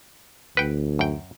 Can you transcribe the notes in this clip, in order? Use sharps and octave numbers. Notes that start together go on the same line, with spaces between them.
D2 B4 F#5 G5
F#2 G5